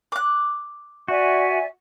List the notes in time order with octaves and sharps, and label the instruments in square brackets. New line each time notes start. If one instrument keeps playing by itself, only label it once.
[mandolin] D6 F#6
[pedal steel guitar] F#4 [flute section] D5 E5 G#5